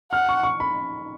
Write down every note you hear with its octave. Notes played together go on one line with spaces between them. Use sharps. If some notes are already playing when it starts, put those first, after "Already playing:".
F#5 F6
C#6
C#6
B5